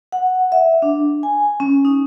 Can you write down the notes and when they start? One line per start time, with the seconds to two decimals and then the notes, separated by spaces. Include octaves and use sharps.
0.12 F#5
0.52 E5
0.82 D4
1.23 G#5
1.60 C#4
1.85 D#4